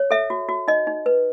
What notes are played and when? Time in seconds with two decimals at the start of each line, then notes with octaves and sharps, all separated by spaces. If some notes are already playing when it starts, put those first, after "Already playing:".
Already playing: C#5
0.11 A4 E5
0.30 F#4
0.49 F#4
0.68 D#4 D#5
0.87 D#4
1.06 B4